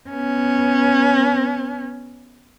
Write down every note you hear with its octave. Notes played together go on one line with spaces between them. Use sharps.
B3 C#4